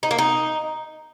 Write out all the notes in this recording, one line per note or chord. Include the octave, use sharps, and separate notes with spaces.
D#4
A#3
D#4